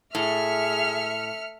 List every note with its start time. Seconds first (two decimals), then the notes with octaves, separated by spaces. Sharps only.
0.15 A2 G#4 E5 F6 C#7